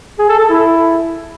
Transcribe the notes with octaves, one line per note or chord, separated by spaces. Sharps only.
G#4
A4
A4
E4